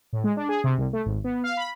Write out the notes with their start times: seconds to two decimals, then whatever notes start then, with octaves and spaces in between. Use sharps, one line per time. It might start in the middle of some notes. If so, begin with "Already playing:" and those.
0.13 A2
0.24 G#3
0.37 D4
0.49 G#4
0.64 C3
0.78 C2
0.93 A3
1.05 G#1
1.24 B3
1.44 F5
1.57 B5